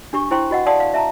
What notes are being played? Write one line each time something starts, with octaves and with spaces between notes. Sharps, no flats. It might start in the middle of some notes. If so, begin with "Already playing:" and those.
D4 G4 C#6
E4 C5 G5 C6 C#6
F#4 D#5 F#5
D5 F5 F#5 A5 C6 D#6
F5
E5 A5 A#5